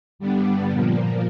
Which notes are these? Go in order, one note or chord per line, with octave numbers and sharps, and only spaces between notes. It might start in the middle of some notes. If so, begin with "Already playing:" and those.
G2 D3 G3 B3 D4
A#2 F3 A#3